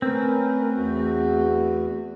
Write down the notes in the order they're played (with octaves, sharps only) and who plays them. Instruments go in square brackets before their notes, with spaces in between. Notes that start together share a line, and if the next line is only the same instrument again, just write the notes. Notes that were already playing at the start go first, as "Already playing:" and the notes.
[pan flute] A3 [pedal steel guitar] C4 [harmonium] C#4 A#4 B4
[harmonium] E2 F#4